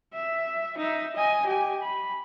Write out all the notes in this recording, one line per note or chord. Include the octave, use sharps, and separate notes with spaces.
E5
D#4 E5
D#5 G#5
G4 G#5
B5